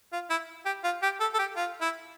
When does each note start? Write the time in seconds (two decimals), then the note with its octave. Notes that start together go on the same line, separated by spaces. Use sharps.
0.13 F4
0.30 E4
0.66 G4
0.84 F4
1.02 G4
1.20 A4
1.34 A4
1.39 G4
1.57 F4
1.81 E4